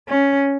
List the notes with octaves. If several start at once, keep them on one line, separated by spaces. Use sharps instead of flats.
C#4